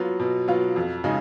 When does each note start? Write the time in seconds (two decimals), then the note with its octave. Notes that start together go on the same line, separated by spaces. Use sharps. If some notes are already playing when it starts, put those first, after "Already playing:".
Already playing: F#3 B3 F4
0.20 B2
0.48 F#3 B3 F4
0.76 F2
1.04 C#3 G#3 D#4